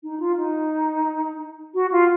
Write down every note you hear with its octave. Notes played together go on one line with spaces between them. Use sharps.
D#4
F4
D#4
F#4
F4